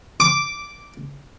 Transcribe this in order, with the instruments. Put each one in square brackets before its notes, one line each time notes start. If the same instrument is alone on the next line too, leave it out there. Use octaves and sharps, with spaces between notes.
[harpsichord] D6